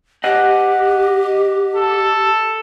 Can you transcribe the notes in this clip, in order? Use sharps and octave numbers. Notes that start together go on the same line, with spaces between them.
G4 D#5 F#5
A4